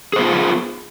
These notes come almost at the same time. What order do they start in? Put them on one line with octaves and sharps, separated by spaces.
G#4 C5 B3 F4